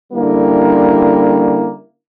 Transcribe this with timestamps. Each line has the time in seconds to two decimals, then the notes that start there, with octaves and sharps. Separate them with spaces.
0.13 D3 G3 A#3 C#4 E4